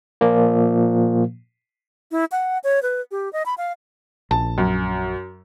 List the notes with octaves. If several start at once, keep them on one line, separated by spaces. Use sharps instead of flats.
A#2 F3 A#3
E4
F#5
C#5
B4
G4
D#5
B5
F5
A#1 A5
F#2